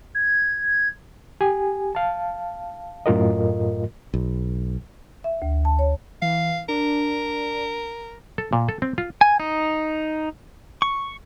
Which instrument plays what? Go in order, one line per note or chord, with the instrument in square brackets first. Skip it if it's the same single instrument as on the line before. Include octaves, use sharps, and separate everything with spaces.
[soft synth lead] G#6
[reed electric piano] G4 G#5
F5 A5
F#2 A2 A3 F4 A#4 D#5
[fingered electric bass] B1
[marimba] E5
D2
A5
C#5
[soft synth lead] E3 [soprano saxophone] F5
[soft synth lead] D4 [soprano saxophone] A#4
[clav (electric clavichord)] A4
A#2
A4
C4
F4
[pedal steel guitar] G#5
D#4
C#6